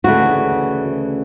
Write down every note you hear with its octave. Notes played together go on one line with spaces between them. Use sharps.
D2 C#3 E3 A3 F#4